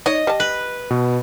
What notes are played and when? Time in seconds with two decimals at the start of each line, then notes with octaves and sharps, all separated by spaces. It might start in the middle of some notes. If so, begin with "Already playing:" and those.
0.06 D#4 C#5 D#5
0.27 G3 A5
0.40 B4
0.90 B2